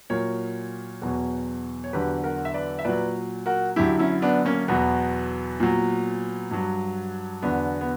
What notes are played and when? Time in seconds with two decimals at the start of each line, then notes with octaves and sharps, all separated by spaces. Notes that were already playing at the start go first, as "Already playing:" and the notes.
0.10 A#2 F#3 A#4 C#5
1.02 E2 B2 F#3
1.84 C#5
1.93 E2 D3 F#3 G4 B4
2.24 F#4 A#4
2.45 E5
2.54 B4 D5
2.79 E5
2.85 A#2 F#3 B4 D5
3.46 F#4 A#4
3.76 F#2 D3 F#3 E4 G4
3.99 C#4 E4
4.22 B3 D4
4.45 A#3 C#4
4.68 E2 B2 F#3 B3
5.60 A#2 F#3
6.51 G2 F#3
7.42 E2 D3 F#3 B3 D4
7.81 B3